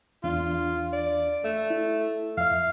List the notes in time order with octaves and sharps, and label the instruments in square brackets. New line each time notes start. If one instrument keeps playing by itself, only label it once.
[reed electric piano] E2 D4 [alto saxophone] F4
[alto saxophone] D5
[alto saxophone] A3 [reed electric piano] E5
[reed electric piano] E4
[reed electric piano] F2 E5 [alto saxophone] F5